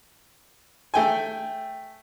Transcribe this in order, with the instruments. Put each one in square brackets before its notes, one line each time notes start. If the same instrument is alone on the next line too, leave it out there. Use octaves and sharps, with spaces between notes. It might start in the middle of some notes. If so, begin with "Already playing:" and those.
[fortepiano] A3 G5 G#5